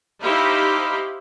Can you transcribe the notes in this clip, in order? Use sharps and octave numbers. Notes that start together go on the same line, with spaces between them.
D#4 E4 G4 C5 F5 B5